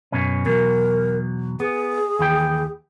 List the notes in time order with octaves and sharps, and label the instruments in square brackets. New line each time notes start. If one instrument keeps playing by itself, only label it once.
[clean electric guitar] F#2 B2 C#4
[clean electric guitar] E2 B2 F#3 [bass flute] A#4
[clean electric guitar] B3 [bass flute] G#4
[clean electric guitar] D#2 E3 G5